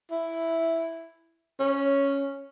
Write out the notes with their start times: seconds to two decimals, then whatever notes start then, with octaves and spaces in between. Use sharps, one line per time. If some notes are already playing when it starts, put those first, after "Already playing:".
0.11 E4
1.60 C#4